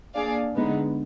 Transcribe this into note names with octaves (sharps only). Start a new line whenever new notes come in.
A#3 D4 G#4 D5 F5
D3 G#3 B3 D#4